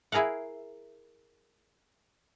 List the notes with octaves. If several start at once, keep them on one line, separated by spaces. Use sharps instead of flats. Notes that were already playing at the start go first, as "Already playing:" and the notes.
E4 G#4 A#4 F5 F#5